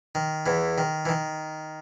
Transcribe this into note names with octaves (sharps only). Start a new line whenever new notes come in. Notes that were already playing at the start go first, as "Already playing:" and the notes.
D#3
E2 E3
D#3
E3
D#3